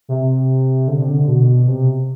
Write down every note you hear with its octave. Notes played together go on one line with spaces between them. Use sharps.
C3
D3
C3
D3
B2
C3